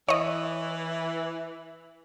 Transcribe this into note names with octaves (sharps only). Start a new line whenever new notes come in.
E3 C#5 D#5